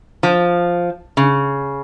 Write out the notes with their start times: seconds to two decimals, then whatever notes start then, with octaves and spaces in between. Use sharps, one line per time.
0.23 F3
1.17 C#3